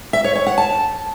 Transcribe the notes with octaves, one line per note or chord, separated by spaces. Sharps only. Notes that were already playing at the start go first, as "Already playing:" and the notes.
E5
C#5
C#5
F#5
A5